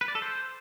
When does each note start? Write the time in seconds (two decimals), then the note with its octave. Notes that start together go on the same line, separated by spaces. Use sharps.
0.01 B4
0.08 D5
0.15 A4
0.22 C5